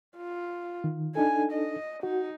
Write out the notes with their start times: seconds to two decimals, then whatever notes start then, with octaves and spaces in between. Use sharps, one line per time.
0.16 F4
0.84 D#3
1.15 D4 D#4 A4 G#5
1.52 D#5
2.03 D#4 F#4